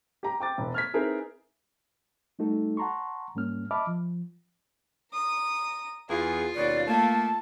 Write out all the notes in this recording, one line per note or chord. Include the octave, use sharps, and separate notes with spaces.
G4 A#5
G5 D6 A6
E1
F6 G#6 B6
C4 D#4 E4 G#4 A#4 B4
G3 A3 D#4 F#4 A4
F#5 A5 A#5 C6 C#6
G#2 G3 A#3 C#4 F6
D#5 E5 A5 B5 D6 F6
F3
A#5 D#6
E2 F4 G#4
D#2 B2 C#4 D5
A3 A#3 A5